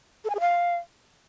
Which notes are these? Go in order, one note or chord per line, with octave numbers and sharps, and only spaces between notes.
A4
G#5
G#4
F5